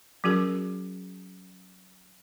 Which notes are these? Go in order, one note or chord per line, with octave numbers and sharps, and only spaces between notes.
F#3 C#4 F#4 G#4 A#4